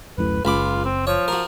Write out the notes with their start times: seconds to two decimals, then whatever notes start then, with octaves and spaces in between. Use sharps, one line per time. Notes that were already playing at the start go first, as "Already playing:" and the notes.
0.18 D1 F#2 A2 B4
0.45 F#1 C#2 F4 B5 D6
0.85 C4
1.07 F3 C#5
1.28 F#4 A#4